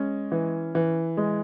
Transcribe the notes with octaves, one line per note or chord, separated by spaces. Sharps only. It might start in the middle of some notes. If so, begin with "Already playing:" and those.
Already playing: G#3 C#4
E3
E3
G#3